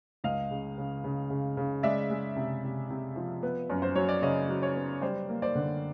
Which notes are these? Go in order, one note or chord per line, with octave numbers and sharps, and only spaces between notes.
C#2 D#5 F5
C#3
C#3
C#3
C#3
C#3
G#3 D5 E5
G#3
C3
C3
C3
F3
B3
F#2
C5
F#3 C#5
D5
C#3 C#5 D#5
F#3
C#5
B3
G3 C5 D5
A#3
C5 D5
D3